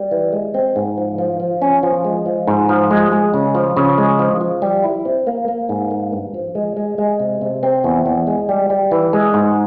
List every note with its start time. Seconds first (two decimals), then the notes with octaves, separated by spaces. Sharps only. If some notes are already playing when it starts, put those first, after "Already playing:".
Already playing: G3
0.11 E3
0.33 G#3
0.54 C4
0.76 G#2
0.98 F3
1.18 F3
1.40 F3
1.62 C#4
1.83 F3
2.05 G#3
2.26 F3
2.47 G#2
2.69 F3
2.91 G#3
3.12 G#3
3.34 C#3
3.55 F3
3.77 C#3
3.98 G#3
4.19 F3
4.41 F3
4.62 G3
4.84 E4
5.05 C4
5.27 A#3
5.48 A#3
5.69 G#2
5.91 A#3
6.12 G2
6.34 F3
6.55 G#3
6.77 G#3
6.98 G#3
7.20 C3
7.41 C3
7.63 C4
7.84 E2
8.06 E2
8.27 G#3
8.49 G3
8.70 G3
8.91 E3
9.13 G#3
9.34 G#2